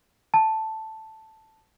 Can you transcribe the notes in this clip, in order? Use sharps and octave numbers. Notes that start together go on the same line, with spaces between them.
A5